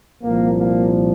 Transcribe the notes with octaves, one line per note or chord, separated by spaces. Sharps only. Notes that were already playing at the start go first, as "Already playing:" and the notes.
C2 A#2 F3 A#3
A#3